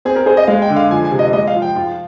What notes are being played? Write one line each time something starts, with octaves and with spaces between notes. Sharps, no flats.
C4 G#4
A#4
G#4 C5
D#5
G#3 F5
G5
D3
F5
F3 G#5
G#5
C3
D#5
G#3 D#5
F5
F3
G5
F4